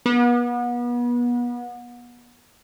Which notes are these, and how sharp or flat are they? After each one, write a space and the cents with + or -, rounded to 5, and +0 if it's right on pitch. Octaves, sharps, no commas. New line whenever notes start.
B3 -35